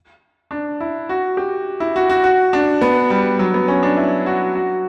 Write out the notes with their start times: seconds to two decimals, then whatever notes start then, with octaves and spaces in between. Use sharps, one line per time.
0.51 D4
0.81 E4
1.09 F#4
1.37 G4
1.80 E4
1.96 F#4
2.09 F#4
2.24 F#4
2.53 D4
2.81 B3
3.10 G3
3.39 F#3
3.54 B3
3.68 C#4
3.83 D4
3.97 E4
4.26 F#4
4.55 F#4